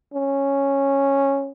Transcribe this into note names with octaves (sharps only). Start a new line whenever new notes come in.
C#4